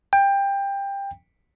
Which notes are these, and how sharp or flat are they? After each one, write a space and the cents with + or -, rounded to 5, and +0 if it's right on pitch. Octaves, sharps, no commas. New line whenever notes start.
G5 +20